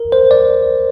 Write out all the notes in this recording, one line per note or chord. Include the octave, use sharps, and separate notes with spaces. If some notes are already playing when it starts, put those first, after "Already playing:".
Already playing: A#4
C5
D5